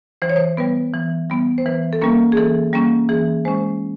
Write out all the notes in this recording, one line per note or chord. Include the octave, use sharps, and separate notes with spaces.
E3 C5
C#5
C5
G3 B3 B4
E3
G3 B3
C5
E3 B4
A4
G3 A#3 C#4 A#4
G#4
E3 A4
G3 A#3 C#4
E3 G#4
G#3 C#4 C5